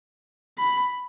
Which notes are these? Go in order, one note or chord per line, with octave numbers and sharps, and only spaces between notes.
B5